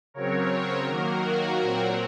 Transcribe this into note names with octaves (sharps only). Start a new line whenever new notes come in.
C#3 F#3 C4 A#4 C#5
D#3 F#3 A#3 F#4 A#4
F#4 A#4
A#2 F#3 C4